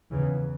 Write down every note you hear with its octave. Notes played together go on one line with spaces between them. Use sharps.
E2 C#3 E3